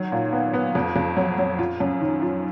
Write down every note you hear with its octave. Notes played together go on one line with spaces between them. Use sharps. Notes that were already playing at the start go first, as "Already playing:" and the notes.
Already playing: D#3 F#3
A#2
B3
B3
F2
F2
F#3
F#3
F4
F#2
D#3
F4